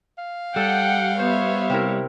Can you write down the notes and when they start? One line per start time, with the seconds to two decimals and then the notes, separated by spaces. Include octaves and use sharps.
0.18 F5
0.56 G3 A4 F#5 G5
1.19 B3 C5 C#5 E5
1.70 C3 E4 A#4